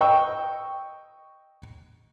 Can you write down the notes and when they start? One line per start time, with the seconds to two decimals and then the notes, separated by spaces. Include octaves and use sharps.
0.01 D#5 G5 C#6 E6